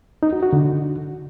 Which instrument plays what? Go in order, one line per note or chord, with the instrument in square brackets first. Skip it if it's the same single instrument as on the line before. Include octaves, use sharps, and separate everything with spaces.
[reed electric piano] D#4
F#4
F#4
D3